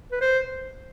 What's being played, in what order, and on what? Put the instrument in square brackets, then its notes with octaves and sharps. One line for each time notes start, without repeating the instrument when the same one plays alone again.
[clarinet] B4
C5